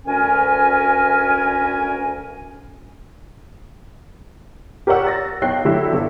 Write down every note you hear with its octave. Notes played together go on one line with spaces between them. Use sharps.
D2 C#4 A#4 G#5
G4 A#4 C#5 D5 F#5 E6
A6 A#6
B1 C#5 G5 F#6 C7
D3 F#3 E4 G4 A4
G1 A4